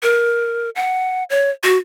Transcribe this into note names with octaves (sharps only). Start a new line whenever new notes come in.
A#4
F#5
C#5
F#4